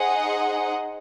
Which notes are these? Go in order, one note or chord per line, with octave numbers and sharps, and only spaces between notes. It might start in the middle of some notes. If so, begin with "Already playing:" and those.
Already playing: D#4 G#4 C5 D#5 F#5